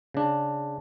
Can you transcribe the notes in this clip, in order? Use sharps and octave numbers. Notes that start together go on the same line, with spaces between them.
C#3 D4